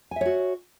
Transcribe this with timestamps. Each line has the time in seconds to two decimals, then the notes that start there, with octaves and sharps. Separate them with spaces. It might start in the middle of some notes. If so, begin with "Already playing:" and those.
0.11 G#5
0.16 E5
0.21 C#5
0.26 F#4